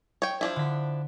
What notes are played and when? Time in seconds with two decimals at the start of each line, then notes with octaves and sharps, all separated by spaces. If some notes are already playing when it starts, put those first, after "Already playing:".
0.22 C#5 G5
0.41 F3 D4 E4
0.56 D3 B6